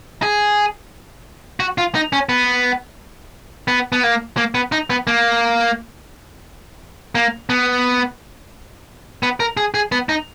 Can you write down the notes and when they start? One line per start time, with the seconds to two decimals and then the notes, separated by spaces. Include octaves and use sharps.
0.22 G#4
1.60 F#4
1.78 F4
1.95 D#4
2.13 C#4
2.29 B3
3.68 B3
3.92 B3
4.03 A#3
4.37 A#3
4.55 B3
4.72 D#4
4.90 B3
5.07 A#3
7.15 A#3
7.50 B3
9.23 B3
9.40 A#4
9.57 G#4
9.74 G#4
9.92 B3
10.09 D#4